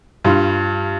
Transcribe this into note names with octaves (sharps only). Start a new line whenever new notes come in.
G2 G3 F4